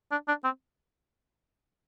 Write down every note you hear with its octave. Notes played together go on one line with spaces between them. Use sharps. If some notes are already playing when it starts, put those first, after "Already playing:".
D4
D4
C4